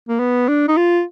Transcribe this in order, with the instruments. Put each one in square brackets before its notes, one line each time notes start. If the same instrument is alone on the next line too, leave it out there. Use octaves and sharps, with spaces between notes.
[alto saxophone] A#3
B3
D4
D#4
F4